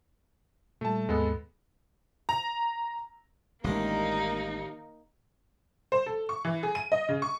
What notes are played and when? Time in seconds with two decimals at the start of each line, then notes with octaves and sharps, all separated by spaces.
0.81 A#2 G3 A3 A5
1.09 D#2 G#2 G#3 B3 A4 B5
2.29 A#5
3.64 A1 D#2 D#3 G#3 A#3 D4 D#4 G4
5.92 C5
6.06 A4
6.29 C#6
6.45 E3
6.63 G#4
6.75 D#7
6.92 D#5
7.09 C#3
7.22 C#6